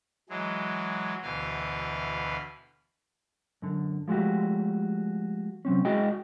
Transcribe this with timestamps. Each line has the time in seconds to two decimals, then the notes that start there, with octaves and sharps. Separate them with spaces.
0.29 E3 F#3 G#3
1.22 D2 B2 E3 B4 F5
3.62 F#2 D3
4.08 F3 G#3 A3 F#4 G4
5.65 C3 F#3 C4 C#4
5.85 G#3 E4 F#4 G#4 D#5 G5